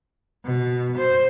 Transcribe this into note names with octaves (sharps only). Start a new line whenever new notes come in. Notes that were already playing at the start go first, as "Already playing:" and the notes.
B2
C5